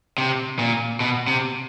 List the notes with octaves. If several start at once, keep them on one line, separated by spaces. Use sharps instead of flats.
C3
A#2
B2
C3